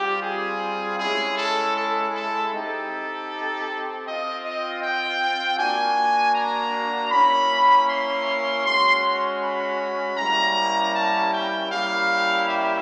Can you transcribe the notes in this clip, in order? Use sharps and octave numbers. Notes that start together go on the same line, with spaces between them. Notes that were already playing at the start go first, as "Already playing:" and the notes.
Already playing: G3 C4 F4 G4
G#4
G#3 C#4 E4 G#4
A4
A4
A4
C4 D#4 G4 A4
C4 F4 D#5
D#5
G5
A#3 D4 F#4 G#5
A#5
A#3 C#4 E4 B5
C6
G#3 C#4 F#4 C6
B5
G3 A#3 C#4 E4 A#5
A5
G5
G3 A#3 C#4 E4 G4 F5
E5